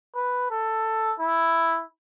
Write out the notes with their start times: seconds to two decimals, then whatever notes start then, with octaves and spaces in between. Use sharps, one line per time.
0.15 B4
0.50 A4
1.20 E4